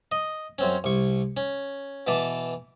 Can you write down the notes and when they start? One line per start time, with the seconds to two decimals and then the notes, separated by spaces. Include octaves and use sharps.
0.12 D#5
0.58 F#2 C4 C#4
0.84 C2 C#6
1.37 C#4
2.07 B2 E3 A5 D6